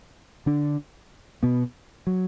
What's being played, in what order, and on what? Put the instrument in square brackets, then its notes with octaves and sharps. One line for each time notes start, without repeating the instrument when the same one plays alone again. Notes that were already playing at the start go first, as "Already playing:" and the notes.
[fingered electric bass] D3 D4
B2 B3
F#3